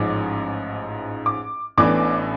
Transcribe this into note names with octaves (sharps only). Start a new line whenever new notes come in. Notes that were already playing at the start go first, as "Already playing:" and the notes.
Already playing: A1 G#2 F3 D6
D6
A1 A2 E3 B3 D4 D6